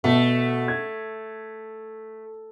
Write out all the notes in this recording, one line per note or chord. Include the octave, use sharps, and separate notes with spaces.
B2 A3
G#6